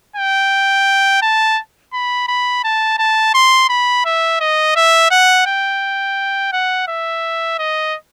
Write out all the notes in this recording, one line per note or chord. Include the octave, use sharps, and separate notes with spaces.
G5
A5
B5
B5
A5
A5
C6
B5
E5
D#5
E5
F#5
G5
F#5
E5
D#5